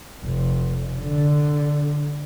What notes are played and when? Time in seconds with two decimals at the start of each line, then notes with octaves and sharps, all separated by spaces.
0.24 F1
1.00 D3